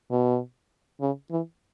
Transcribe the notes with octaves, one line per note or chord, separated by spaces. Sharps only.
B2
C#3
E3